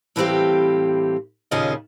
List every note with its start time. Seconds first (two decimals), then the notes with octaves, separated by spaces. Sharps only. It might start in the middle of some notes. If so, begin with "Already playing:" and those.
0.16 A2 E3 G3 C4 G4 F5
1.51 D#2 A#2 C#3 C#4 F4 D#5